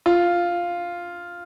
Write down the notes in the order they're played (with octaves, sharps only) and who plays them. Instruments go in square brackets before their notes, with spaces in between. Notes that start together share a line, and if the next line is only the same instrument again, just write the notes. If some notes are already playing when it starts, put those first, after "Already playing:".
[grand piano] F4